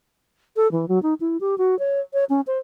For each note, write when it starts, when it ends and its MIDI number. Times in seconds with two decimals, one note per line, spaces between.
0.56 0.70 69
0.72 0.88 52
0.88 1.01 54
1.03 1.14 63
1.20 1.37 64
1.41 1.58 67
1.58 1.77 66
1.79 2.00 73
2.13 2.24 73
2.29 2.41 61
2.47 2.58 72